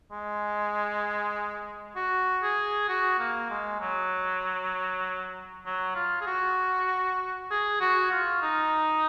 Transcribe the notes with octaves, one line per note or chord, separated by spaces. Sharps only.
G#3
F#4
G#4
F#4
A#3
G#3
F#3
F#3
F4
G#4
F#4
G#4
F#4
F4
D#4